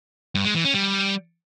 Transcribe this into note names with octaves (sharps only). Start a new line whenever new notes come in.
G2
G#3
E3
C#4
G3